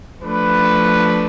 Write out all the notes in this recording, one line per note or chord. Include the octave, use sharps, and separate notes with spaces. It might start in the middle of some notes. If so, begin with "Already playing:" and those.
F3 A3 D4 B4